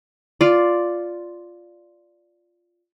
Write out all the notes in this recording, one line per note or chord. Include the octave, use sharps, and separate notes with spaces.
F4 D5